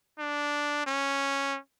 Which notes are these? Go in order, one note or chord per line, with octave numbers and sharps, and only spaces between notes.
D4
C#4